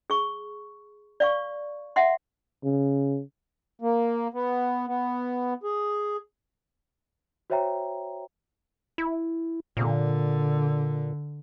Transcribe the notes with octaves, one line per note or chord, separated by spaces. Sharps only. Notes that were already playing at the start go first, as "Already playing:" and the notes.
G#4 C#6
D5 F5 C#6
E5 F#5 C6
C#3
A#3
B3
B3
G#4
F#4 C5 C#5 E5 G5 A#5
E4
A#2 D3